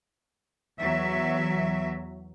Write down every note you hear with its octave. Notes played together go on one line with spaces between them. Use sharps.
E2 F#3 E5